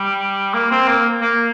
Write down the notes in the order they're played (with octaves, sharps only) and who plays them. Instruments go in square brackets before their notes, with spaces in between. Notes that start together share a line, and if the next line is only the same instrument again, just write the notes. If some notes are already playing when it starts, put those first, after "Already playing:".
Already playing: [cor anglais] G3
A#3
C4
A#3
A#3